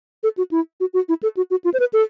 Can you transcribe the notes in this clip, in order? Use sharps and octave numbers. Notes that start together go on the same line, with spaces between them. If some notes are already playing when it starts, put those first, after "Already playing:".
A4
F#4
E4
F#4
F#4
E4
A4
F#4
F#4
F4
C5
B4
A4